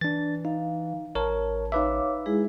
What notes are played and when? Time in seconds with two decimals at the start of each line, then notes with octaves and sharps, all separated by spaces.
0.01 E3 D4 A6
0.45 D#4 F5
1.15 A1 A#4 C#5 A5
1.72 D#4 B4 C#5 E5 F5 D6
2.26 G#3 E4 G#4